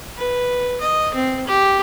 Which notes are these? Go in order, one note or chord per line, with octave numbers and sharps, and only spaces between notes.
B4
D#5
C4
G4